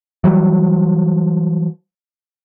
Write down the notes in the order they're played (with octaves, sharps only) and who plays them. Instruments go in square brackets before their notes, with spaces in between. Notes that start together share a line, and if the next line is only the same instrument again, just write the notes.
[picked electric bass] E3 F#3 G3